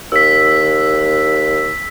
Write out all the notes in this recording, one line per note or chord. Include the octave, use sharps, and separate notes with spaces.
D#2 E6 B6